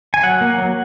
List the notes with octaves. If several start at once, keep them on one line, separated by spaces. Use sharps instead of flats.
G#5
F#3 F#5
A#3
F#3